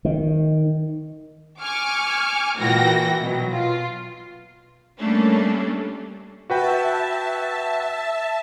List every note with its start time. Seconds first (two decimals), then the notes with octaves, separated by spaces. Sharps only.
0.05 D#3
1.60 G#5 C#6 D6 F6
2.58 A#2 E3 F#4 G5 A#6
3.21 B2 F#3
3.52 F4
4.98 G3 A3 A#3 C#4 D4
6.50 F#4 B4 E5 G5 A5